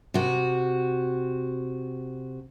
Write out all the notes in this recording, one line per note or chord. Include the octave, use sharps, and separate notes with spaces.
C3 F#4